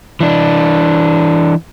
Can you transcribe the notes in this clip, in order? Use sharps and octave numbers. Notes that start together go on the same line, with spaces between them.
E3 D4